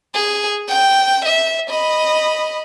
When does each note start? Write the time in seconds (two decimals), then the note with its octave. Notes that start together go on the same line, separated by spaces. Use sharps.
0.14 G#4
0.69 G5
1.25 E5
1.70 D#5 B5